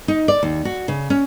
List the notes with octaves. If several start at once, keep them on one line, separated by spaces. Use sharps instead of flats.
D#4
D5
D#2
F#4
C#3
C#4